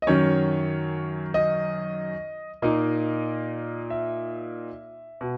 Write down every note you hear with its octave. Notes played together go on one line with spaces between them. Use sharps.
D#5
F#2 D#3 F#3 C#4 C#5
D#5
A#2 A#3 D#4 D#5
E5
B2